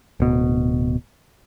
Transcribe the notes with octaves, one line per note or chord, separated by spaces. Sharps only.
D1 B2